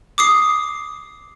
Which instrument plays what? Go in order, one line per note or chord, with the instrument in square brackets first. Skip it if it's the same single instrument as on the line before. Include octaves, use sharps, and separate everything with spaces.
[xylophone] D6 D#6 C7